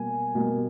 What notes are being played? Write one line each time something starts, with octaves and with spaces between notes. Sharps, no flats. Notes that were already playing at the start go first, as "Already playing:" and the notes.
Already playing: B2 G3 A#3 G#5
B2 G3 A#3